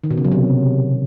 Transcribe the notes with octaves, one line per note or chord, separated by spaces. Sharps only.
D#3
B2
C#3
F#3
C3